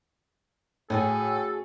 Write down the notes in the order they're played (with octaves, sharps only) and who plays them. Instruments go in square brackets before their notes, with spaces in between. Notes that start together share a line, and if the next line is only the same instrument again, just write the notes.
[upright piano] A2 [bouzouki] C#4 F#4 G#4 [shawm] A4